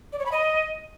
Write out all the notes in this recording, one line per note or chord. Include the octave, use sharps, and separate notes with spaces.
D5
C#5
B5
D#5